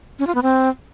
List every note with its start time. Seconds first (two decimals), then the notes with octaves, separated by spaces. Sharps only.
0.19 C#4
0.27 F4
0.35 B3
0.43 C4